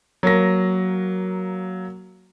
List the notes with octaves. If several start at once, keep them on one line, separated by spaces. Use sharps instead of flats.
F#3 A#3 A#6